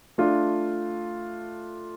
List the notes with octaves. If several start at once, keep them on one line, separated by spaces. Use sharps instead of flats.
A3 D4 F4